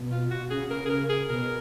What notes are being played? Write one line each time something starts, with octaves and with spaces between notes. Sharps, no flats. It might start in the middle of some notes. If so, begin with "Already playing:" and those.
Already playing: B2
F4
F#4
C#3 G#4
A#4
G#4
A#4
G#4
B2 A#4